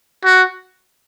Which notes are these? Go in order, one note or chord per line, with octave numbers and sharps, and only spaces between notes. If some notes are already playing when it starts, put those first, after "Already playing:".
F#4